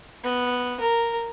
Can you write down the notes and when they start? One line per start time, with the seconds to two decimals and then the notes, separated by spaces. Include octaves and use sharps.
0.24 B3
0.80 A#4